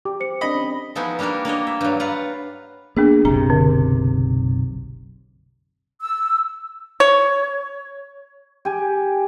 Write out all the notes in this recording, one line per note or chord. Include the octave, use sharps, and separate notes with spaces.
G4 D6
C5 C#7
C4 D4 A#4 D#5 B5
C#4
F3 G#3 B3 D#4 E4 F#4
G3 A#3 D4 F#4 A#4
A#3 D4 C#5 D#5
E5
G2 F#3
F4 B4 F#5 A#5
A#3 B3 D4 G#4
F#1 B1 C3 A#5
D3
E6
C#5
G4 G#5